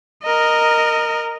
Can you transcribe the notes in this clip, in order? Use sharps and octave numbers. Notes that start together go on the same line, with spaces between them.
A#4 D#5